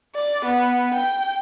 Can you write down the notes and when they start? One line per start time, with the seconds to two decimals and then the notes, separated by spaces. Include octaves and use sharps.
0.15 D5
0.45 B3
0.94 G5